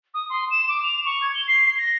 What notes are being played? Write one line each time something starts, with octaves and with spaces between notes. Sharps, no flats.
D#6
C6
E7
D6
F7
C#6
G#6
G7
C7
C7
A#6